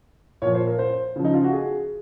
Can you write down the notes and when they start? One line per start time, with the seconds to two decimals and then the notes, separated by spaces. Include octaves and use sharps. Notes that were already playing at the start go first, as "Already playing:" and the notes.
0.42 A#2 F3 C#5
0.55 C5
0.67 A#4
0.79 C5
1.16 C#3 F3
1.25 D#4
1.34 F4
1.44 F#4
1.53 G#4